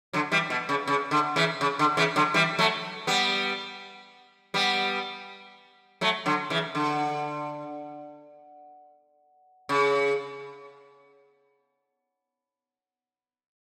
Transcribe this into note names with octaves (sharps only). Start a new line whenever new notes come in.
D3 F#3
E3 G3
B2
C#3
C#3
D3
C#3 E3
C#3
D3
C#3 E3
D3 F#3
E3 G3
F#3 A3
G3 B3
G3 B3
F#3 A3
D3 F#3
C#3 E3
D3
C#3